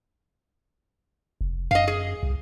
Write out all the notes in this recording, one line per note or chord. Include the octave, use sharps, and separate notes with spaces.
F1
F#2 D#5 F5
G#4
C2